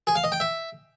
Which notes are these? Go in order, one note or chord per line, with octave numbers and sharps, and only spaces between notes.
G#4
F5
D#5
G5
E5